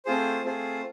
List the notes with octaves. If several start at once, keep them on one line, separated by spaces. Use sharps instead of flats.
A3 C4 F4 G#4 C5
A3 C4 F4 G#4 C5